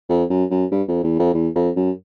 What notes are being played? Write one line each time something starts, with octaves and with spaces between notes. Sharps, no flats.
F2
F#2
F#2
G2
F2
E2
F2
E2
F2
F#2